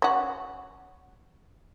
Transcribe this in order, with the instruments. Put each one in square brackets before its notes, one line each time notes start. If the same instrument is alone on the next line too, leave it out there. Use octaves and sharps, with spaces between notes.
[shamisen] C#4 F#4